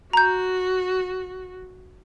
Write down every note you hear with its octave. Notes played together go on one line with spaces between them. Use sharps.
F#4 A#5 G6